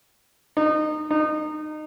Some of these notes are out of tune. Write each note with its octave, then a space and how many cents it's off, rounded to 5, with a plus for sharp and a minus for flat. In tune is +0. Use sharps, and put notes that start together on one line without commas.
D#4 -25
D#4 -25